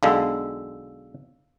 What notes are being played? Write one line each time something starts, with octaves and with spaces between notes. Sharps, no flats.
B1 D3 G#3 F5 E6